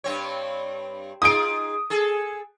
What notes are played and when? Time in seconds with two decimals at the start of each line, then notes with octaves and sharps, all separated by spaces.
0.04 G2 C4 C#5
1.22 D#4 F4 G#4 D#6 D7
1.90 G#4 A4